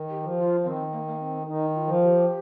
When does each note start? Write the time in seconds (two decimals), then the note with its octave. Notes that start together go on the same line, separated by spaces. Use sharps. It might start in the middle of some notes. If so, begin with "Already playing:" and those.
Already playing: D#3
0.10 G4
0.23 F3
0.37 F4
0.64 D#3 C4
0.92 A#3
1.07 A#3
1.19 C4
1.47 D#3 D#4
1.74 F4
1.87 F3
2.02 G4